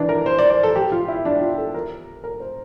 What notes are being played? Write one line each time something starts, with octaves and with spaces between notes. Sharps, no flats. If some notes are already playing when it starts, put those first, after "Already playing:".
Already playing: E3 D4
A#4
C5
D5
D5
A4
G4
F4
E4
D4
F4
A4
A#4
A#4
C5